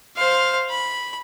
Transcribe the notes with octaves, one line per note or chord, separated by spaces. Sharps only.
C5 F5
B5